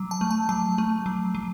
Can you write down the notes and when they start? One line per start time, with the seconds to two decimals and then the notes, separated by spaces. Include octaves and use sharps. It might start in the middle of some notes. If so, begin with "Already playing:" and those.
Already playing: F#3
0.11 A5
0.21 A3
0.31 A5
0.49 F#3 A5
0.78 A3
1.06 F#3
1.35 F#3